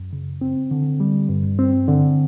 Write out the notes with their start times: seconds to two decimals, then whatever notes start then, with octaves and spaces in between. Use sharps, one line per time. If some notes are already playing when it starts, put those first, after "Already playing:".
Already playing: F#2
0.13 C#3
0.41 C4
0.71 D3
1.00 G3
1.29 G2
1.59 C4
1.88 D3